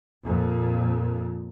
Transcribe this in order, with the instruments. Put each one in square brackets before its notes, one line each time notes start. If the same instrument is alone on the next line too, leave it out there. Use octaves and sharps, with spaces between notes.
[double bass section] F2 A#2